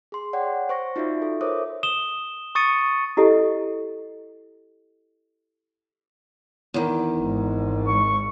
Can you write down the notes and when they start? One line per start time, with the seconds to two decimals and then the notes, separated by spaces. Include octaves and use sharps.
0.12 G#4 C6
0.33 C#5 D5 F#5 G5
0.69 C5 C#6 A#6
0.96 D#4 F4 F#4 D5 E5
1.22 A4
1.41 A#4 C5 C#5 E5 D6 D#6
1.83 D#6 E7 G7
2.55 C#6 D#6 A6 C#7 D#7
3.17 E4 G4 A4 D#5
6.74 E2 D#3
7.19 G#1 G#2
7.87 C#6